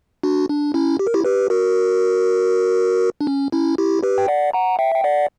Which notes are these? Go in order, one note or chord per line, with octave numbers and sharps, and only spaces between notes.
D4 F#4
D4
C#4 E4
G4
A#4
E4 G4
G4 B4
F#4 A#4
D4
C#4
C#4 E4
E4 G4
G4 B4
G5
D5 F#5
F#5 A#5
E5 G5
G5
D5 F#5